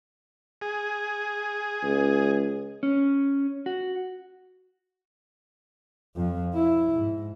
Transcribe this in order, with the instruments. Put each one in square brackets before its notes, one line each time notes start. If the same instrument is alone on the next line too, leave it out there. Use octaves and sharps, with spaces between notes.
[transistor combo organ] G#4
[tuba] C#2
[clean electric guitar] C#4
F#4
[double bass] F2 F3
E4
G#2